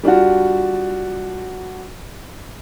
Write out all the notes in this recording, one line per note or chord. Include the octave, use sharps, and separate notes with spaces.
G3 D4 F4 F#4